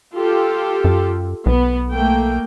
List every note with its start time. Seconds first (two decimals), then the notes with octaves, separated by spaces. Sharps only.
0.16 F4 G4 A4
0.84 F#2
1.46 B1 B3
1.91 A3 A#3 G5